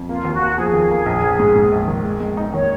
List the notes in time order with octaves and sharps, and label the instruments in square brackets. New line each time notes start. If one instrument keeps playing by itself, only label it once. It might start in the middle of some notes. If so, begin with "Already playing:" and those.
Already playing: [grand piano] F2
[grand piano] A#3 [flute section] F4
[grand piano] D#2
[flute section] F#4
[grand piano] A#3
[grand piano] F3 [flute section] G#4
[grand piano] D#2
A#3
A#1
A#1
G#2
G#2
A#1
D#3
G#3
G#3
D#4
[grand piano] D#3 [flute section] C#5